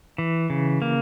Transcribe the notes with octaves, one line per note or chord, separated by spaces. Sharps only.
E3
C#3
A#3